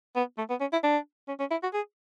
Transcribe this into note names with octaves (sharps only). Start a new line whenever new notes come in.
B3
A3
B3
C#4
E4
D4
C#4
C#4
E4
F#4
G#4